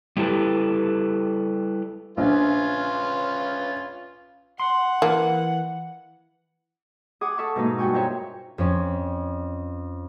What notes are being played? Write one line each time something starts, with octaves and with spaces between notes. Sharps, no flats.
G3 E4 G4 A4 B4
A#1 C#4 F4 B4
F#5 C6
E3 A#3 F4
G#4 F#5 D6 D#6
A4 E5 C#6
G#2 B2 G#3 A#3 D#4
G2 F#4 G5 G#5 C#6
F4 A#4 C5 C#5 E5
F2 C#4 C#6